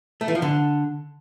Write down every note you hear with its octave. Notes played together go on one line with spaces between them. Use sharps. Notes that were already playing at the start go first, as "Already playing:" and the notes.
A3
E3
F3
D3